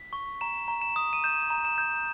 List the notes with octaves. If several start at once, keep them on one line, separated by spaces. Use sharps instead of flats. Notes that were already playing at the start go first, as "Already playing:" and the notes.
Already playing: B6
C#6
A#5 E7
A#5
E7
D#6
D#7
G6 E7
A#5
E7
G6